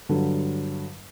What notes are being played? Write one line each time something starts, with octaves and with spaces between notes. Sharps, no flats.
G2 D3 F#3